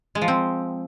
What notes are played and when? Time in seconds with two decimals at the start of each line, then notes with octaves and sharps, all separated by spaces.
0.15 G#3
0.22 F3
0.28 C4